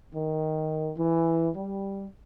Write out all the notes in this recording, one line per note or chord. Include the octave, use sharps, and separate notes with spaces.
D#3
E3
G3